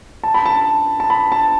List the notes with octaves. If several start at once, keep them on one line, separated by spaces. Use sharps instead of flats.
A5
B5
A5
A5
B5
A5